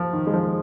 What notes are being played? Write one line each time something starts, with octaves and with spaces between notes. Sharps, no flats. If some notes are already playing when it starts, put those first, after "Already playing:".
Already playing: F3
D#3
G#3
F3